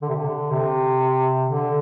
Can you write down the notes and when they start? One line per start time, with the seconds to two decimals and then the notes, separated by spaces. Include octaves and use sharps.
0.02 D3
0.09 C3
0.16 D3
0.51 C3
1.49 D3